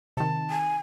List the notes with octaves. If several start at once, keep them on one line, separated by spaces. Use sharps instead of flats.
C3 D#3 A5
G#5